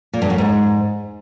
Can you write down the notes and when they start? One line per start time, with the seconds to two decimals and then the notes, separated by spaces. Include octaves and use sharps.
0.13 A#2
0.22 G2
0.30 F#2
0.38 G#2